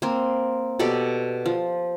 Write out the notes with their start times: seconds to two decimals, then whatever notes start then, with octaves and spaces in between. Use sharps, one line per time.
0.02 A#3 C4
0.79 B2 G4 A4 D5
1.46 F3